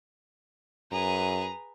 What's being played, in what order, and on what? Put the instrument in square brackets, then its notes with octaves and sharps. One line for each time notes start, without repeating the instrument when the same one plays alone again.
[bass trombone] F#2 [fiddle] G#4 B4 [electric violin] A#5